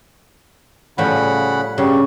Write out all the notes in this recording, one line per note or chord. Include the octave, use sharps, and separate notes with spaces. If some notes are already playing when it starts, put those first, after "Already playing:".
A2 C#3 F3 G3 F#5 B5
G2 C#3 G3